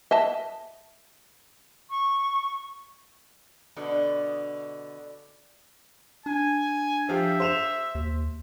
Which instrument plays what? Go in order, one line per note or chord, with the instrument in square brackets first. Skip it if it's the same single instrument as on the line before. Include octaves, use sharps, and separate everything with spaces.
[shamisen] D#5 E5 A5
[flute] C#6
[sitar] B2 D3
[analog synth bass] D4 [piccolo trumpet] G#5
[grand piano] F3 F4 G4 [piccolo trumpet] E5
[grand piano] C5 E7 F7
[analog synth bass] D#2